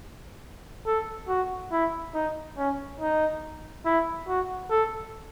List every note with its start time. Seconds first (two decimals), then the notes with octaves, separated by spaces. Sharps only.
0.87 A4
1.29 F#4
1.72 E4
2.15 D#4
2.57 C#4
3.00 D#4
3.85 E4
4.28 F#4
4.71 A4